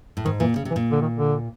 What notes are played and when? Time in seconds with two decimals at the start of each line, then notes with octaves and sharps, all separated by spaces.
0.17 A2
0.25 G#2 D#3
0.40 A#2 E3
0.56 C#3
0.65 C3
0.71 E3
0.76 A#2
0.91 D3
1.02 D#3
1.16 D3